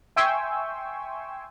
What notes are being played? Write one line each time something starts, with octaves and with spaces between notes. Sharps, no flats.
E5 G5 G#5 C6 C#6 E6